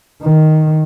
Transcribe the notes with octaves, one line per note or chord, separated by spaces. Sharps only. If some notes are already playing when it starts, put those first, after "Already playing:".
D#3